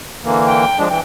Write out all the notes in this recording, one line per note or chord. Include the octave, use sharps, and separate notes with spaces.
D3 E3 A#3
G5
F3 G#3 D4
E3 G5